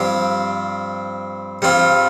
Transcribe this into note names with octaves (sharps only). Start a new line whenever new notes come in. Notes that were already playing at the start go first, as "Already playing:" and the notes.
Already playing: G2 F3 C4 G4
G2 G3 C4 F4